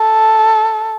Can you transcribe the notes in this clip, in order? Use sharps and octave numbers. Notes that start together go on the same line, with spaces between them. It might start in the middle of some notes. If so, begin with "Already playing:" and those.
Already playing: A4